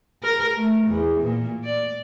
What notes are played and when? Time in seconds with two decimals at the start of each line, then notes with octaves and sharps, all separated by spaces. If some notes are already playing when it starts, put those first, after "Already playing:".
0.23 A#4
0.56 A3
0.87 E2
1.22 A#2
1.64 D5